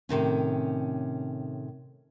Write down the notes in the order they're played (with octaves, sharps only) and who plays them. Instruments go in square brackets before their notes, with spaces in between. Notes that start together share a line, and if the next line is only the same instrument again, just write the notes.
[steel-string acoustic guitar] A2 C3 D#3 C#4